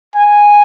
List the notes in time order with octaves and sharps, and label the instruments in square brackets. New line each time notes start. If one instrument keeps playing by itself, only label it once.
[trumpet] G#5